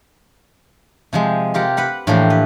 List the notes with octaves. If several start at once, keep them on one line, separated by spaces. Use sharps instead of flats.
C3 F3 G#3
F4 G4 A#4 F#5
B4 F#5 B5
A2 E3 F3 A#3 D4 G4
B4